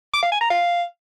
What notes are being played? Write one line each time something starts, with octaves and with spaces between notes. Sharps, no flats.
D6
F5
G#5
A#5
F5